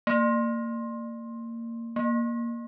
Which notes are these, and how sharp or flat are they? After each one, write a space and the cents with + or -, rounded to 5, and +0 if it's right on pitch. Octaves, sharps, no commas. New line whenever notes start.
A#3 -20
A#3 +5